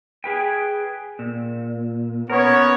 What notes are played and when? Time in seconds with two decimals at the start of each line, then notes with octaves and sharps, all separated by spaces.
0.24 G#4 B4 G5
1.19 A#2
2.30 B3 C#4 A#4 C#5